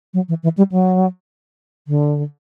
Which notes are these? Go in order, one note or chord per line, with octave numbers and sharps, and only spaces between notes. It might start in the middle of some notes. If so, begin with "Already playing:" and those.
F#3
E3
E3
G3
F#3
D3